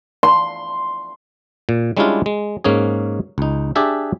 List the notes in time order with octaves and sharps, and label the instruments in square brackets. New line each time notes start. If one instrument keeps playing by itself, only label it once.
[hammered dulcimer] C6
[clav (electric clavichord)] A#2
G3 G#3 C#4 D4 E4 F4
G#3
G#2 A#3 C#4 G#4
C#2 D#4
D4 G4 G#4 E5 A5